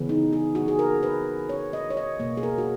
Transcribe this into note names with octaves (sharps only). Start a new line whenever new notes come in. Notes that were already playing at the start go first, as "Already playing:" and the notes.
Already playing: C#3 E3 B3
D#4
G#4
F#4
G#4
A#4
B4
C#5
D#5
C#5
D#5
B2 A#3 C#5
G#4
A#4
F#4